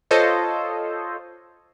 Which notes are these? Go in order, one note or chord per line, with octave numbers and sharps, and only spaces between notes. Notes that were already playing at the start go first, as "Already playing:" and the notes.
F4 A4 C5 C#5 D#5